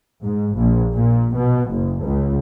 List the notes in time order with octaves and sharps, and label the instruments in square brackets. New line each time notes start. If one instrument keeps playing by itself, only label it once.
[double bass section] G#2
A#1
A#2
B2
F#1
C#2